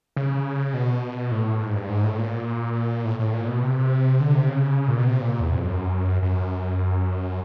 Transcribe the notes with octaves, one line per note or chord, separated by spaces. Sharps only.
C#3
B2
A2
G#2
G2
G#2
A2
A#2
A2
A2
A#2
B2
C3
D3
C3
C#3
A#2
B2
C3
A#2
E2
F2
F#2
F#2